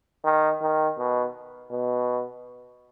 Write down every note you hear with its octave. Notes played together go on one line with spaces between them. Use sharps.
D#3
D#3
B2
B2